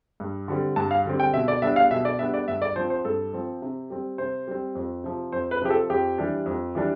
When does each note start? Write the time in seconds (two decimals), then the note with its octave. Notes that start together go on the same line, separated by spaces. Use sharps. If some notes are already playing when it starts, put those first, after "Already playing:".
0.20 G2
0.48 D3 G3 C4
0.76 G2 A5
0.91 F5
1.05 D3 G3 C4
1.20 G5
1.33 B2 E5
1.48 D5
1.62 G3 B3 D4 E5
1.76 F5
1.91 B2 E5
2.05 D5
2.19 G3 B3 D4 E5
2.34 D5
2.48 G2 E5
2.62 D5
2.76 F3 C4 C5
2.90 C5
3.05 G2 A4
3.33 F3 C4
3.62 C3
3.90 G3 C4
4.18 C3 C5
4.47 G3 C4
4.75 F2
5.04 C3 F3
5.32 F2 C5
5.51 B4
5.61 C3 F3 G4
5.70 A4
5.90 F2 G4
6.18 E3 G3 D4
6.46 F2
6.75 E3 G3 D4